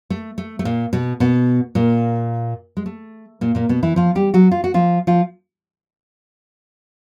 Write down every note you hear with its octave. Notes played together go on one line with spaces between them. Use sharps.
A3
A3
A3
A#2 A#3
B2 B3
B2 B3
A#2 A#3
G#3
A3
A#2 A#3
A#2 A#3
B2 B3
E3 E4
F3 F4
G3 G4
F#3 F#4
F4
F#4
F3 F4
F3 F4